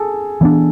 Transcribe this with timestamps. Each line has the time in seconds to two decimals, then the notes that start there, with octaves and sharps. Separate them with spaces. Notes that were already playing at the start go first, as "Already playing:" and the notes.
Already playing: G#4 A4
0.41 E3 B3 D4